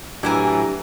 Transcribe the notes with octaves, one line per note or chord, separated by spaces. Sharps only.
A2 E3 F#3 D4 E4 G4 A#4 G#5